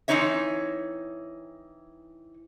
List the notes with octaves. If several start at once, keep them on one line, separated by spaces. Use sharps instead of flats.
E3 A#3 C4 D#4 C#5 E5